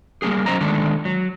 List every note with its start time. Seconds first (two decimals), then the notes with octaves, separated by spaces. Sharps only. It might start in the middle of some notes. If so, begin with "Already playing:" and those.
0.22 G3 A#3 B3 G4 G#4
0.46 F#3 C#4 C5 D#5 A#5
0.61 D3 D#3 G#3 D4 A4
1.05 F#3